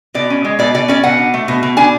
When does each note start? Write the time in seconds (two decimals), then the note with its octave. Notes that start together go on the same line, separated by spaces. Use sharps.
0.14 B2 D5
0.30 C#4
0.45 G#3
0.59 B2 D5
0.74 B2 D5
0.88 C#4 D5
1.04 B2 F#5
1.18 D4
1.34 A3
1.48 B2
1.63 B2
1.77 D4 G#5